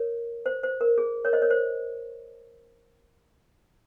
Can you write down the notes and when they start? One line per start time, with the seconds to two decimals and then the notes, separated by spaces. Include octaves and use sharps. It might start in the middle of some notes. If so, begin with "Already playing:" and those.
Already playing: A#4 C#5
0.46 C5
0.63 C5
0.81 A#4
0.98 G#4
1.25 A#4 C#5
1.33 C5 D#5
1.42 A#4 C#5
1.51 C5